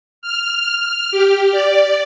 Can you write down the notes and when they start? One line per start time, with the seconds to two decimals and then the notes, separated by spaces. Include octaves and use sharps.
0.22 F6
1.11 G4
1.52 D5